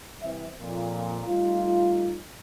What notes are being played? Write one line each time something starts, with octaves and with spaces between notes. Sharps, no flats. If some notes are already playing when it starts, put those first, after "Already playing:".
C2 E3 C4 E5
F2 A#2
G3 A3 D#4 F4